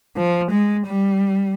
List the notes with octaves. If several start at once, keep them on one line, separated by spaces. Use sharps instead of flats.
F3
G#3
G3